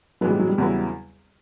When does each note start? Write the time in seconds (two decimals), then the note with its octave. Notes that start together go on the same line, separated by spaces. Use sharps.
0.21 A2 E3 F#3 G#3 B3
0.30 G3
0.39 F#3
0.49 G3
0.58 E2 C#3 F#3 B3 E4